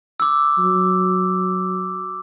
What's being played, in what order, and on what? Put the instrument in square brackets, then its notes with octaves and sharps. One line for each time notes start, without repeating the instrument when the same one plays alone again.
[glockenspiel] D6 E6
[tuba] F#3